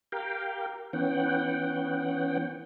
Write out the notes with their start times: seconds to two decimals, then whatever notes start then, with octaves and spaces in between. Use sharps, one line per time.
0.12 G4 A#4 F5 G5
0.93 E3 B3 C#4 F#5 G5